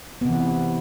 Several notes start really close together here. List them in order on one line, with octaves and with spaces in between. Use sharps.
B3 C3 E3